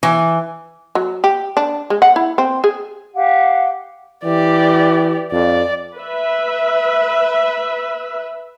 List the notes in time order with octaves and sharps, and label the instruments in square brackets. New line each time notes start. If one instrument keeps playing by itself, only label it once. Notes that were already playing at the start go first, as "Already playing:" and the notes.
[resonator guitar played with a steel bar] E3
[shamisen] F#3
G4
D4
G#3
F#5
E4
C4
G#4
[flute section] G4 F5 F#5
[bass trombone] E3 [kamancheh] G4 D5
[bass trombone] F2 [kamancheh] D5
[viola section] B4 E5